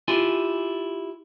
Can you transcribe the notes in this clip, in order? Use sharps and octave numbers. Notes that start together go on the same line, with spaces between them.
E4 F4 G4 G#5